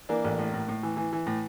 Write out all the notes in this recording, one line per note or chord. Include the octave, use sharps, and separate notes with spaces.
E3 A#3 D4
A1
A2
A2
A2
E3
E3
E3
A2